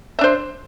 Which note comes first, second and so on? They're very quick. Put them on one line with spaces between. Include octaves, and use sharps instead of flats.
E5 D4 C5